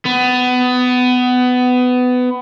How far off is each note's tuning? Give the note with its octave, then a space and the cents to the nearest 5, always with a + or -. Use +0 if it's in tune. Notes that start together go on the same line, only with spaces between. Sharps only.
B3 +20